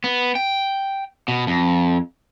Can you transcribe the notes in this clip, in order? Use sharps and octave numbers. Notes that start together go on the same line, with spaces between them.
B3
G5
B2
F2